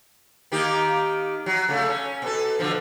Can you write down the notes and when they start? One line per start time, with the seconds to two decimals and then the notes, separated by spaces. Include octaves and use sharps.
0.52 D#3 A#3 G4
1.46 F#3
1.68 C#3 A3
1.89 C#4
2.22 B2 A4
2.59 B2 D3 F3